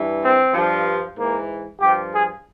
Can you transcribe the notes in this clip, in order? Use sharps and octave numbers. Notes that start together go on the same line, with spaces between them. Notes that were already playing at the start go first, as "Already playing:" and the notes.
Already playing: G2 E3
C4
G2 F3
G#2 E3 A#3
G2 F3 G4
G#4